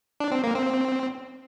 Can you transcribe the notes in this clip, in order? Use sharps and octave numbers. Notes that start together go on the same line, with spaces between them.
D4
C4
A#3
C4